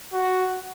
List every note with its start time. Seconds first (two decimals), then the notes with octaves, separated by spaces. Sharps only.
0.13 F#4